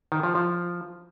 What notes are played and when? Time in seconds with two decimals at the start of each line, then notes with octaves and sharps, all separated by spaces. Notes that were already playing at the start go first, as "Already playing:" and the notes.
0.12 D#3
0.23 F3
0.35 F3